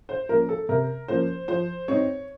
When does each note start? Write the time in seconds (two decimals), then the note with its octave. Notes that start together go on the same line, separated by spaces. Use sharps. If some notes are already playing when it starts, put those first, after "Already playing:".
0.09 C5
0.29 F3 A#3 C#4 A#4
0.49 A4
0.69 C3 A#4
1.08 F3 A#3 C#4 C5
1.48 F3 C5
1.88 C4 D#4 C#5